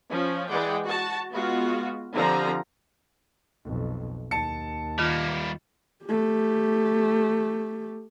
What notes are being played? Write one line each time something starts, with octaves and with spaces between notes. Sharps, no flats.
F3 C#4
E3 G#3 G#4 D5 F#5 G5
F#4 A5
G#3 B3 F4 F#4
D3 F3 C4 G4 A#5
B1 F2
D#2 A5 C#7
D#3 G3 A#3 F4 F6
A3 G4